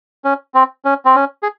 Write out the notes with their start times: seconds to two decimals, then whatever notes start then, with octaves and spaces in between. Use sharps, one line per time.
0.24 C#4
0.54 C4
0.85 C#4
1.05 C4
1.15 C#4
1.43 G#4